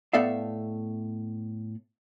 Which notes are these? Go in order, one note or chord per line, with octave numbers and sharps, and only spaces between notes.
A2 B3 A4 D5 E5 F5